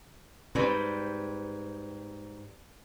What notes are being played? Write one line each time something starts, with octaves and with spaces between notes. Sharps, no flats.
G#2 G3 C4 B4